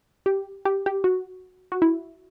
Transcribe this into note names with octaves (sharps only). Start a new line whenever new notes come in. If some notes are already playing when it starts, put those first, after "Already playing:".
G4
G4
G4
F#4
F#4
E4